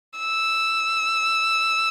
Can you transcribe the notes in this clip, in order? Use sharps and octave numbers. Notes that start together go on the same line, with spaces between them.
E6